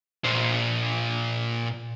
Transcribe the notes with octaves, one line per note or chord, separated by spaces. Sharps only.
A#2 C5